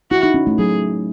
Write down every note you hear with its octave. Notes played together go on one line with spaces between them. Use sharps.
E4 F#4
D#4
C#4
A3
F#3 G#4